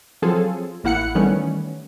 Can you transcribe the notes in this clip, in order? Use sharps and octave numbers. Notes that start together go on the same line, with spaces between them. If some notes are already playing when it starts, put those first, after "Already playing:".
F3 F#3 C4 F4 G#4 A4
A1 A#3 E4 F#5 F#6 C#7
D#3 E3 G3 A3 B3 C#4